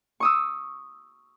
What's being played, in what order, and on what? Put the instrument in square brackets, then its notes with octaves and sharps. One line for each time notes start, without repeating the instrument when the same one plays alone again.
[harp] C#6 D#6 E6